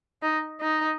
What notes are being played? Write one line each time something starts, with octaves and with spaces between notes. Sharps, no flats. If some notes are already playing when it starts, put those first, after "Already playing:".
D#4
D#4